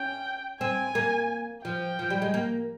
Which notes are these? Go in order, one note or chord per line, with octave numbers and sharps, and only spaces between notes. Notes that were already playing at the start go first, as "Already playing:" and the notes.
Already playing: C#4 G5
C4 G#5
A#3
F3 G5
F3
G3
G#3
A#3